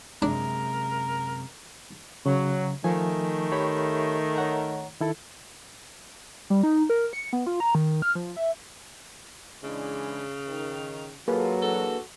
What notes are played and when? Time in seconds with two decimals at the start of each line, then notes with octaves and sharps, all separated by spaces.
0.22 F#2 C3 G#3 D4 A#4
2.26 C#3 F#3
2.84 D#3 F3 A3 G#5
3.52 G4 C#5 B5
4.36 C#5 F#5 A#5
5.00 D#3 E4 A4
6.50 G3
6.63 D#4
6.90 A#4
7.13 C#7
7.33 B3
7.46 F4
7.60 A#5
7.75 D#3
8.02 F6
8.15 F3
8.36 E5
9.63 C#3 E3 G#3 D4
10.47 D#3
11.28 F#3 A#3 F4 G#4 A4 B4
11.62 E3 D4 F#4 A4